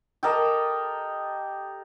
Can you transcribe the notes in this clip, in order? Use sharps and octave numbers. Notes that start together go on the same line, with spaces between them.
G4 A4 A#4 D#5